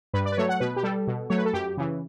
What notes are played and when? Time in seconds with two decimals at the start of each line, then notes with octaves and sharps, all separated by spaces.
0.13 G2 B4
0.25 D5
0.32 B4
0.37 F#3 A3 C#5
0.49 F#5
0.60 B2 B4
0.76 G4
0.83 G3 A4
1.07 B2
1.30 F#3 A3 C#5
1.38 B4
1.45 A4
1.53 F#2 G4
1.77 C#3 E3